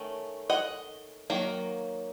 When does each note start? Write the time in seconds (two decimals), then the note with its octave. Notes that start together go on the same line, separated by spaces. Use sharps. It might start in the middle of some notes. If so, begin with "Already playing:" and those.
Already playing: D#3 A3 C#4
0.50 D#5 F#5
1.30 D#3 F#3 A#3